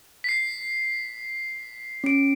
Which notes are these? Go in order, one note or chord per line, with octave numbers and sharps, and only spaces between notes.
B6 C7
C#4 D7